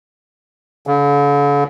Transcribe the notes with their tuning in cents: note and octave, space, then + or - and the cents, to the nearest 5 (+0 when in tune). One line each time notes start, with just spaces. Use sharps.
D3 -45